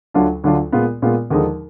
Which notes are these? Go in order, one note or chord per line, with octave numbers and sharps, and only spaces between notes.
D2 D3 F#3 D4 F4
D2 D3 F#3 D4 F4
A#2 G#3 B3 F4
A#2 G#3 B3 F4
D#2 D3 F3 G#3 D#4